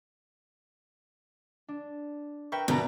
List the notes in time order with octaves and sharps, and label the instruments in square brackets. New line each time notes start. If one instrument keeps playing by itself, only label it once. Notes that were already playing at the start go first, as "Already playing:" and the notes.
[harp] D4
[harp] A#4 B4 E5 [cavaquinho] G5 C#6
[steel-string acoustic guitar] B2 [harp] D3 D4 [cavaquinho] A#4 B4 A#5